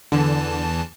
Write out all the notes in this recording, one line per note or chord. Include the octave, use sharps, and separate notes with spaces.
E2 D3 E3 A5